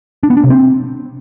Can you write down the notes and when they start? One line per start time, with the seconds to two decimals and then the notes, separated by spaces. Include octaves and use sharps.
0.23 D4
0.30 B3
0.37 D4
0.44 C3
0.50 C4